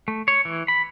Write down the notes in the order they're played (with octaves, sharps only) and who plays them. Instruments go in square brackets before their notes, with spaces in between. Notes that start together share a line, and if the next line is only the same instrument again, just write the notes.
[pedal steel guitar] A3
C#5
E3
B5